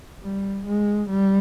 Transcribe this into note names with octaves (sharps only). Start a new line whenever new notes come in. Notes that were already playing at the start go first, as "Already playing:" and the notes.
G3
G#3
G3